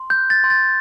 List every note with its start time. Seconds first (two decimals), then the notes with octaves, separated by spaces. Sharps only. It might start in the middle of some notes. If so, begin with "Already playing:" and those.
Already playing: C6
0.10 G6
0.17 F#6
0.30 A6
0.44 C6
0.50 A6